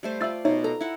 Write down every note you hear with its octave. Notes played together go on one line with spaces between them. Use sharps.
G3 A3 C5
F4 D5 E5 E6 A6
B2 D#4 C#5 E5
A4 A#5
E4 F#5